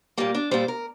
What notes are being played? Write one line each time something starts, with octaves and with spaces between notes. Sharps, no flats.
A#2 G3 A#3
D4
A#2 G3 C5
A#4